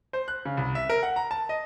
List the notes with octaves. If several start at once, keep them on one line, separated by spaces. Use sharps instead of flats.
C5
F#6
C#3
C2
E5
A#4
F#5
A#5
A5
D#5